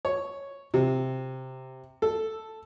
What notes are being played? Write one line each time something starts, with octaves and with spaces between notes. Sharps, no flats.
C#5
C3
A4